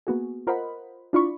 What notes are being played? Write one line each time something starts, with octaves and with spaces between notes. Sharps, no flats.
A#3 B3 F#4 G#4
F4 A#4 C5 D#5 F#5 B5
D4 E4 F4 D5 B5 C#6